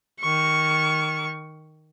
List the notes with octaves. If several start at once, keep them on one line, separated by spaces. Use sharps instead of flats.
D#3 C#6